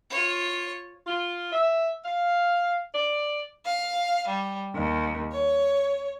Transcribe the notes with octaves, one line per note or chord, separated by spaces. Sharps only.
F4 C#5
F4
E5
F5
D5
F5
G3
D#2
C#5